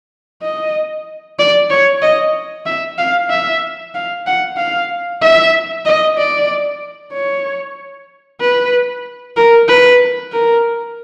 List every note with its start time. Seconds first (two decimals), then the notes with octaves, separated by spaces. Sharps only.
0.43 D#5
1.39 D5
1.70 C#5
2.02 D#5
2.66 E5
2.98 F5
3.30 E5
3.94 F5
4.27 F#5
4.57 F5
5.22 E5
5.86 D#5
6.18 D5
7.13 C#5
8.41 B4
9.37 A#4
9.68 B4
10.32 A#4